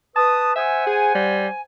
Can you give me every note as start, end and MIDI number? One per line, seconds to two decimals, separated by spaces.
0.16 0.54 71
0.16 0.55 81
0.16 0.54 87
0.55 1.61 72
0.55 0.84 76
0.55 1.61 78
0.55 1.61 80
0.86 1.15 68
1.15 1.48 55